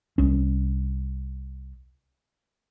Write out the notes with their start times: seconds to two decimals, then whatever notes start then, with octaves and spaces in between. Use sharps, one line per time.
0.18 C2 C#4